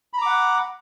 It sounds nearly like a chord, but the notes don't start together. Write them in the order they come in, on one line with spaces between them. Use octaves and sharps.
B5 A#5 D6 F#5